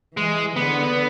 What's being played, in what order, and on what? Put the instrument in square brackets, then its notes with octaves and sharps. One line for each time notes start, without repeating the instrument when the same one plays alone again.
[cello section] E3 [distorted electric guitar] G#3
[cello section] D3 [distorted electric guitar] B3